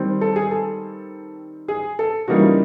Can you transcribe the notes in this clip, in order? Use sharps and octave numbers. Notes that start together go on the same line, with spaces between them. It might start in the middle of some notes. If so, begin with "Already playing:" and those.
Already playing: D#3 G3 C4
A4
G#4
A4
G#4
A4
C#3 E3 G3 A#3 D#4 F#4
F4